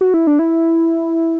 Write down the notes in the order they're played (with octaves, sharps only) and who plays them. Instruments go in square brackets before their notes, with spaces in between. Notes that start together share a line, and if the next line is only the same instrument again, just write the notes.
[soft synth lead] F#4
E4
D4
E4